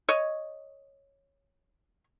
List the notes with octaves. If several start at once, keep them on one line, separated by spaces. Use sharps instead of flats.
C#5 D#5